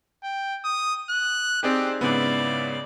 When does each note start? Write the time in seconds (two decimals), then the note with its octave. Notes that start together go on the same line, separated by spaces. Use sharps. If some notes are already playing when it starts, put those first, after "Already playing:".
0.23 G5
0.64 D#6
1.10 F#6
1.63 C4 D#4 G4 G#4 D5
2.01 G#2 C#3 B3 E4 D5